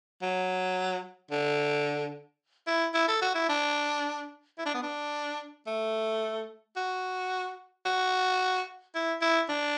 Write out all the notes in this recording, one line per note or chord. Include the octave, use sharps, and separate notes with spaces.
F#3
D3
E4
E4
A4
F#4
E4
D4
E4
D4
B3
D4
A3
F#4
F#4
E4
E4
D4